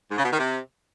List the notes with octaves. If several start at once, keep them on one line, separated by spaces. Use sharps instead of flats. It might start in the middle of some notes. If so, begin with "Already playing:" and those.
G#2
C#3
B2
D#3
C3